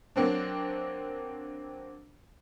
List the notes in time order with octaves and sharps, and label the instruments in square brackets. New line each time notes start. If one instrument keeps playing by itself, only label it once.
[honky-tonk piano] F#3 A#3 C4 D4